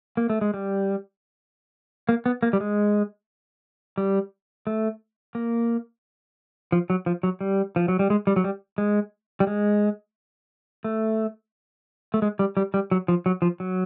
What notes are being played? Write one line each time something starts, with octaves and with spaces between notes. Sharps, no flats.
A#3
A3
G#3
G3
A#3
B3
A#3
G3
G#3
G3
A3
A#3
F3
F#3
F3
F#3
G3
F3
F#3
G3
G#3
G3
F#3
G3
G#3
G3
G#3
A3
A3
G#3
G3
G3
G3
F#3
F3
F#3
F3
F#3